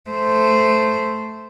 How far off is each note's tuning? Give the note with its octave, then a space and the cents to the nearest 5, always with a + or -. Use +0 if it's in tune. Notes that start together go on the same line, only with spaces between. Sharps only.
A3 +0 C5 -10